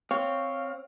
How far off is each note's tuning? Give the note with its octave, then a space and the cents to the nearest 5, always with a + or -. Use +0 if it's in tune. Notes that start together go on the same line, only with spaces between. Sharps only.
C4 +0 C#5 +0 F5 +0